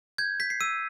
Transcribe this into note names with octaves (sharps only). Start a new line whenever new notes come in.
G6 G#6
G6 B6
C7
E6 D#7